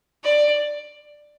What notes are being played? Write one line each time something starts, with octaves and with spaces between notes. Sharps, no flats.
D5